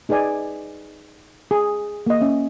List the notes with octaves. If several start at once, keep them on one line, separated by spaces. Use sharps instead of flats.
D#4 G#4 B4 D5 G#5
G#4
A#3 D#5
C#4 E5